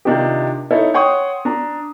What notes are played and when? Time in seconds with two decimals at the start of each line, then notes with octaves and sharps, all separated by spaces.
0.05 C3 D#3 D4 D#4 F4 G4
0.71 D#4 E4 A4 C#5
0.94 C#5 F#5 G5 C6 C#6 D#6
1.45 D4 A#5